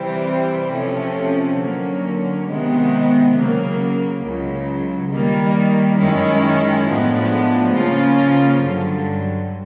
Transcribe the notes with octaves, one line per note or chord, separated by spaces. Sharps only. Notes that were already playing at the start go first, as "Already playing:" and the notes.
Already playing: C3 E3 G3 C4
C3 F3 A3 C#4
D3 F#3 A#3 C#4
C3 D#3 G#3 B3
C#3 F#3 A#3
C#2 C#3 F#3
D#3 G3 A#3
F#2 D#3 G#3 C#4 E4
A2 F3 G#3 B3 D4
C#3 F3 A#3 C#4 F4
G2 D3 F#3